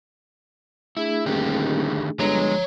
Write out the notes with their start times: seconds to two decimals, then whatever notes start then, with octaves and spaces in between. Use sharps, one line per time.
0.97 A3 D4 E4 G#4
1.26 D#1 D3 D#3 G4
2.20 G1 G#3 C#5 A#5